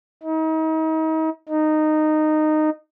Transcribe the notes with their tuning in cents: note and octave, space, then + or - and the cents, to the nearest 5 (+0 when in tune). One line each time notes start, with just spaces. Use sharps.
D#4 +35
D#4 -15